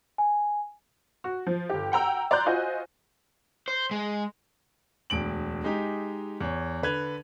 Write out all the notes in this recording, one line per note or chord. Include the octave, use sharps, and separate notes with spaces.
G#5
F#4
F3
G1 G4
F#5 G5 A#5 E6
D5 A#5 C6 F#6 G6
F4 F#4 C5 D#5 G#5
C5
G#3
E1 D2 D7 F#7
G#3 D#4 G4
E2 C#5
D3 B4 G#6 F7